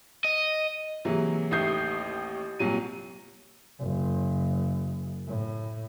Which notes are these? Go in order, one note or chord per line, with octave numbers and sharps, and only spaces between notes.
D#5
C3 E3 F#3 G#3 A#3
A1 D#2 A3 D#6 G6 C7
C2 A#2 F#3 D#7
F#1
A2